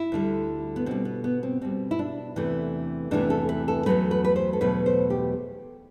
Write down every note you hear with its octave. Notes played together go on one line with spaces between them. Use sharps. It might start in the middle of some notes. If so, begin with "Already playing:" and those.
Already playing: E4
D2 D3 G3
B3
B2 G3 C4
B3
B3
C4
B2 G3 C4
E4
D4
E2 C3 E3 A3
E2 C3 E3 A3 D4
A4
B4
A4
E2 B2 F#3 A3 B4
B4
B4
C5
A4
E2 B2 F#3 A3 B4
C5
G4